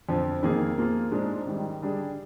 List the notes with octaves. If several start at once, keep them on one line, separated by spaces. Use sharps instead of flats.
F2 D3 F3
F2 D#3 A#3 F4 G#4
F3 A#3 F4 G#4
G#2 F3 G#3 D4
G#2 D#3 G3
D3 G3 D4 G#4